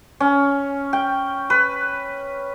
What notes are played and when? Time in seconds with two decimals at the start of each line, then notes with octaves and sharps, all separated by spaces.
0.20 C#4
0.93 G5
1.50 B4